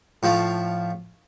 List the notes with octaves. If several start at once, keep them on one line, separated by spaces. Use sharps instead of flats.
A2 F3 A3 F5